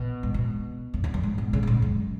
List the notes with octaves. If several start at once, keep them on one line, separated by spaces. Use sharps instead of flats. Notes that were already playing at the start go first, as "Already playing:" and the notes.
Already playing: B2
G#2
B2
F#2
E2
F#2
G#2
B2
C#3
B2
G#2
F#2